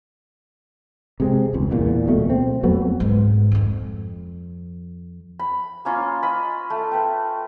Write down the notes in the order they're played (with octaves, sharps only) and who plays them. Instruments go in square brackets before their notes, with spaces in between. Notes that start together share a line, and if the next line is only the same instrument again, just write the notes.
[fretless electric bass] C3 G#3 C4
E1 C#2
E2 A#2
D1 B2 A3
C4
F2 F#3 A3 B3
[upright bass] G#2
F2 F3
[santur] B5
A#3 C#4 F4
D#5 B5
A3
B4 G5